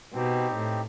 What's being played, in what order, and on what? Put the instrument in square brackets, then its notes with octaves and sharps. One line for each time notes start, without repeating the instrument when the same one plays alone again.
[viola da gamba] B2 [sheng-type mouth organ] C4 D#4 G4
[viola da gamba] A2